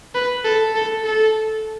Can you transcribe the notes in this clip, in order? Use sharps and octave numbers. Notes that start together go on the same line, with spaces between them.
B4
A4
A4
A4